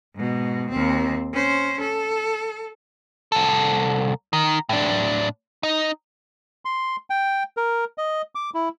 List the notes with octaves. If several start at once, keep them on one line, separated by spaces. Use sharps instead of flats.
G#2 B2
D#2 C4
C#4 C5
A4
C2 A4
D#3
A2 D4
D#4
C6
G5
A#4
D#5
D6
E4